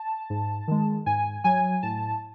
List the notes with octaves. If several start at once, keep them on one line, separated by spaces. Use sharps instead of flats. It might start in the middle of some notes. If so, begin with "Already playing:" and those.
Already playing: A5
G#2
D#3 G#3
G#2 G#5
F#3 G#5
A2 A5